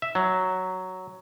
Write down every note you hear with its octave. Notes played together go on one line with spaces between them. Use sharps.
E5
F#3